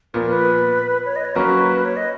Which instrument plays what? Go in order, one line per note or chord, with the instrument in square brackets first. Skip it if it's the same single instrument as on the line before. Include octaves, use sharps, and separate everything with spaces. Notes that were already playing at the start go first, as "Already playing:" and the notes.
[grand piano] A#2 F3 B3 [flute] A#4
[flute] B4
C#5
D#5
C#5
[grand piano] F#3 A#3 C#4 F#4 A#4 [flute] B4
[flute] C#5
D#5